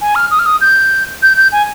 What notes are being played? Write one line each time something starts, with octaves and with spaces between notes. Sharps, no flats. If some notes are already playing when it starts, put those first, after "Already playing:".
G#5
F6
D#6
F6
D#6
G6
G6
G6
G#5